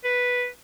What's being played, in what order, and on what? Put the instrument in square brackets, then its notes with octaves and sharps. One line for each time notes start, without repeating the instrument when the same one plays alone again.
[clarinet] B4